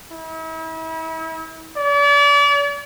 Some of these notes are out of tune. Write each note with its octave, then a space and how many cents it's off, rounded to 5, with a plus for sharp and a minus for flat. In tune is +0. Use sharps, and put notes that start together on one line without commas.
E4 -40
D5 -40